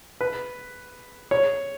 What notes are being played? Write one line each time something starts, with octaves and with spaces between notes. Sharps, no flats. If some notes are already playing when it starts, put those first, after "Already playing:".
B4
C#5